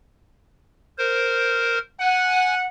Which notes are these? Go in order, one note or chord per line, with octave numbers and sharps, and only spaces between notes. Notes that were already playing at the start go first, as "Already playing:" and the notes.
A#4 C5
F#5 G#5